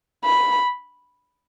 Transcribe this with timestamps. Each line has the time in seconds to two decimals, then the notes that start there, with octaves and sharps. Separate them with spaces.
0.24 B5